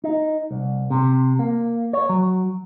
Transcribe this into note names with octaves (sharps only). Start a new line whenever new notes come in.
D#4
C2
C3
A#3
C#5
F#3